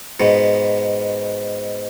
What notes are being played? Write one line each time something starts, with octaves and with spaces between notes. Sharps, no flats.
G#2 B2